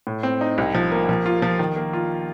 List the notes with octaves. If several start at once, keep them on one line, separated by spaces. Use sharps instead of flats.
A2
C4
D#4
C2
F3
A#3
F3
F4
F3
D#3
A#3
F4